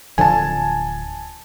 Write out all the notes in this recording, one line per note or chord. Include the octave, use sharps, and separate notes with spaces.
D1 D3 F3 G#5 A5